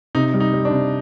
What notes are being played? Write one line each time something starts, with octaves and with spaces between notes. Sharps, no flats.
C3 D#4
G3
D#4
G3
D4
C3